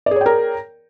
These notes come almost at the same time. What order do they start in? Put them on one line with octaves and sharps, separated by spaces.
D5 G#4 C#5 G5 A#4